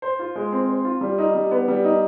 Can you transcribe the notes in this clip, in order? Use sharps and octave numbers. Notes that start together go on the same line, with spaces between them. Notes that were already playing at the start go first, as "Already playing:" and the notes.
C5
F4
G#3
C4
C5
F4
G3
D#4
G3
B3
G3
D#4